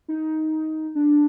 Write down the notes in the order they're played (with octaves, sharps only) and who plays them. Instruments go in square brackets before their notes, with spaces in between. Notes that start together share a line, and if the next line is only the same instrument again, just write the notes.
[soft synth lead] D#4
D4